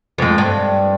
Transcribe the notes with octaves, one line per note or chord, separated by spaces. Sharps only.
F2 G#3
G2